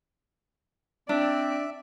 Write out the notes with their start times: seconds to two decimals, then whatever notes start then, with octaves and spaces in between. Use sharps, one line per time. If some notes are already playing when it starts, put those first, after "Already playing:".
1.09 C4 D4 D5 E5